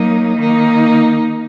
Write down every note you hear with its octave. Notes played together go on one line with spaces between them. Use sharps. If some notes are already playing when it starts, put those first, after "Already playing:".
Already playing: F#3 A#3 D#4
D#3 A#3 D#4